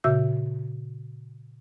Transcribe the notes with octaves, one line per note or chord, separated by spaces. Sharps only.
A#2 C#3 F#4 E5 E6 G6